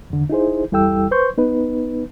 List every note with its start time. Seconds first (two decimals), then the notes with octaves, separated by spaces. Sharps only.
0.10 E2 D3
0.30 D#4 E4 G#4 C5
0.72 E2 G3 E4 A4 G5 E6
1.11 B4 C5 C6 C#6 G6
1.38 B3 D#4 B4